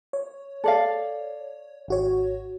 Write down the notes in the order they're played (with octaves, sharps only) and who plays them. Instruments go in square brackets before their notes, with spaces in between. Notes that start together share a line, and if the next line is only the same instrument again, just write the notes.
[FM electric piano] C#5
[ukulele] A4 D5 F5
[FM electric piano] G#1 F#4 C#5